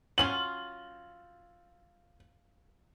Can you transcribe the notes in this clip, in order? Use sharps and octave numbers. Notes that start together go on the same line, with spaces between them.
F#3 C#4 F4 F#7